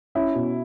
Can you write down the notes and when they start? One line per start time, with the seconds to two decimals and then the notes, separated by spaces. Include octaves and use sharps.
0.15 C#4 E4
0.35 B2